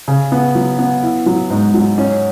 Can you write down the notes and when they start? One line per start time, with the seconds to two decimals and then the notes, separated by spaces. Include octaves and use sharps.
0.08 C#3
0.32 B3
0.55 F#3
0.79 B3
1.03 E4
1.26 F#3
1.50 G#2
1.74 F#3
1.98 C#4